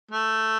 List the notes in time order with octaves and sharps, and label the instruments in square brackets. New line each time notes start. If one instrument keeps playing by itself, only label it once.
[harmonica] A3